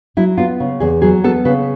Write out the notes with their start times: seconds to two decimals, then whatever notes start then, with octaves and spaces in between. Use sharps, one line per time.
0.17 F#3 E4
0.38 B3 F4
0.60 C#3
0.80 E2 G#4
1.02 F#3 G#4
1.24 B3 A4
1.45 C#3 B4